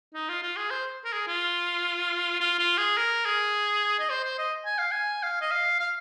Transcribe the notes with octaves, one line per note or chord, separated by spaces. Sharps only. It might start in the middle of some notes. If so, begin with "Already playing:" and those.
D#4
F4
F4
G#4
C5
A#4
G#4
F4
F4
F4
G#4
A#4
G#4
D#5
C5
C5
D#5
G#5
F5
G#5
F5
D#5
F5
F5